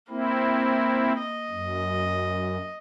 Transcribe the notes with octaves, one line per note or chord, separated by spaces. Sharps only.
A#3 C4 E4
D#5
F#2